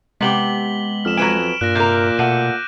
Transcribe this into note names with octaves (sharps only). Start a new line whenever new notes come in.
C3 G#3 B3 G4 B6 F#7 G7
F2 F6 E7
F#3 B4 G#5 D7 E7
G2 A#2 F#6 A#6
C3 A#4 D6 G6
B2 A3 F#5 D#7